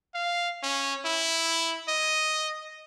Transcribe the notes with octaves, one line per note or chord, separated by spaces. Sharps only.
F5
C#4
E4
D#5